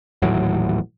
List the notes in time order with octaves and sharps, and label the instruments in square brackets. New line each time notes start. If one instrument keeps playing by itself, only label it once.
[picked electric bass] D#1 A1 A2 F#3